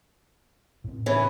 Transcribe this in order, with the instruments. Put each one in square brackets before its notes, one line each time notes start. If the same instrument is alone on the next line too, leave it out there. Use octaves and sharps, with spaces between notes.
[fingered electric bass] A2 C4
[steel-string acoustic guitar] C#3 E3 [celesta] C#5 B5